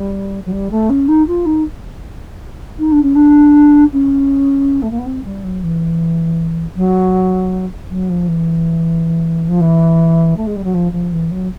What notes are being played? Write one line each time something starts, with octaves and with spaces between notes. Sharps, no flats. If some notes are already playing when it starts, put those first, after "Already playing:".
Already playing: G3
F#3
G3
A3
C#4
D#4
F4
D#4
D#4
D4
C#4
D4
C#4
A3
A#3
B3
C4
G3
F#3
E3
F#3
F#3
F3
E3
F3
E3
A3
G#3
G3
F#3
F3
F3
E3
F#3